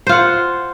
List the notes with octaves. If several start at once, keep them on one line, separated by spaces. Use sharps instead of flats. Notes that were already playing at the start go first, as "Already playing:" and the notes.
F4 C5 F#5